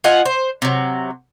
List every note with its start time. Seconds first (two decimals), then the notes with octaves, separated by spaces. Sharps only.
0.04 F4 D#5 F#5 G#5
0.25 C5
0.62 C3 F#3